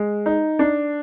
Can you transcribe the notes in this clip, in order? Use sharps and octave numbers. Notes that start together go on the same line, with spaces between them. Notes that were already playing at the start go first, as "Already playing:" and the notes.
Already playing: G#3
D#4
D4